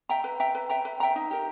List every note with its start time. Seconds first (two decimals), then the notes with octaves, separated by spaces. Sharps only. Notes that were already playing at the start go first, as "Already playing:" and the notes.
0.09 E5 G5 A#5
0.24 B4
0.40 E5 G5 A#5
0.55 B4
0.69 E5 G5 A#5
0.85 B4
1.00 E5 G5 A#5
1.16 D#4
1.31 G4 A#4